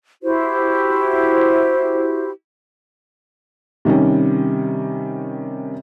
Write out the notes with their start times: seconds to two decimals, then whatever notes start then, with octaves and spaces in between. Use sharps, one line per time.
0.22 E4 F#4 G4 C5
3.85 C3 D#3 G3 C#4